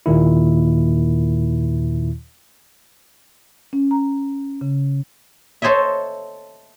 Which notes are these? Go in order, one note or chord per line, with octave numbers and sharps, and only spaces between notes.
D#2 A#2 D#3 E4
C#4
A#5
C#3
A4 C5 C#5 D#5 E5